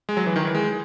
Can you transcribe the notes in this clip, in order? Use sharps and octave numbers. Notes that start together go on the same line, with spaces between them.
G#3
F#3
E3
D#3
E3
G#3